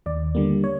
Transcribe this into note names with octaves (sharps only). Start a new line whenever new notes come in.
D#2 D5
D3 G3 A#3
C#5